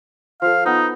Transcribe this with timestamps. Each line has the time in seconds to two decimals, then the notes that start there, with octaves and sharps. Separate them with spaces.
0.42 F3 A4 F5
0.66 B3 D#4